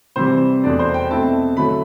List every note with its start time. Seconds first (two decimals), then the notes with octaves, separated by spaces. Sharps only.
0.16 C3 E3 G3 C5
0.64 E2 B2 A3 D4 D5
0.79 C5
0.94 G5
1.10 B2 A3 C4 E4 A5
1.57 D3 F#3 A3 E4 B5